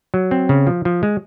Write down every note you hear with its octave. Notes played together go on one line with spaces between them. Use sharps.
F#3
C4
C#3
F3
F3
G#3